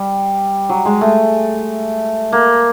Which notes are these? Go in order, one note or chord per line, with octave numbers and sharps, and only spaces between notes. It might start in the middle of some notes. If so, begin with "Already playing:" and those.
Already playing: G3
F#3
G#3
A3
A#3